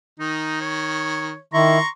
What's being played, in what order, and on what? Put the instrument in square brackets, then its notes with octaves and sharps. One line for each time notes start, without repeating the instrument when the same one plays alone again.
[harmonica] D#3 [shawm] D#4
[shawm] C#5
[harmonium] D#3 E4 [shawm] A#5 [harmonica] C6 C#6